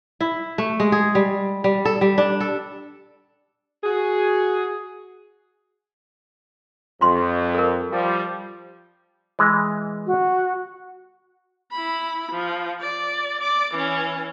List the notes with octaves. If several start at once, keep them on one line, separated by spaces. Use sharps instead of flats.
E4
A3
G#3
G#4
G3
G3
A4
G3
D4
A4
F#4 G#4
F2 F4 C6
A4 A#4
F3 G3
E3 G#3
F#4
E4 B5
F3
D5
D5 D6
E3 C#4